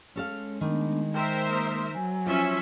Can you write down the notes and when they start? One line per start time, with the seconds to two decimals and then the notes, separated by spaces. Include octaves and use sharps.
0.16 G#3 C#4 A4 F5
0.61 D#3 A3 B3 D4
1.14 A#4 C5 E5 G5
1.47 A#3 C6 D#6
1.94 F#3 G#5
2.26 F3 C#4 F4 E5